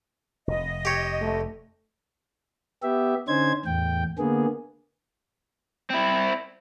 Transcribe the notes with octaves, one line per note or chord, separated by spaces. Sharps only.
F1 D#5
G4 C#5
A3
B3 G4 E5
D3 C#4 D#4 C5 G#6
E2 A2 G5
D3 A#3 B3 G#4
C4 E4